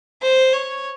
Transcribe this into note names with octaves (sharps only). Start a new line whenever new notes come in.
C5
C#5